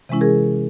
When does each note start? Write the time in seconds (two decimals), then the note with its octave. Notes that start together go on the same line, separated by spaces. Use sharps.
0.09 C3 E3 G#3 C#4 E4
0.21 G#4 A#4